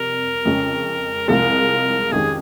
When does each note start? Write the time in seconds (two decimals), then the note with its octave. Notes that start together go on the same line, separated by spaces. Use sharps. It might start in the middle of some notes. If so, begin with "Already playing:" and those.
Already playing: F2 C3 G3 A#4
0.45 F2 C#3 G#3 C#4
1.28 C2 C3 F3 G#3 A#4
2.12 F2 D#3 G#3 C#4 G4 G#4